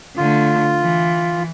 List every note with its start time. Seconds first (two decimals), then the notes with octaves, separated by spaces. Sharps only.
0.17 D3 A3 F4
0.81 E3